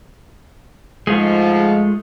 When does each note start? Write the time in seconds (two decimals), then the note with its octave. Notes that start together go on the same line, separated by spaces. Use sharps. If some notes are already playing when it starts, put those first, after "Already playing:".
1.07 G#2 F3 G#3 A3 F4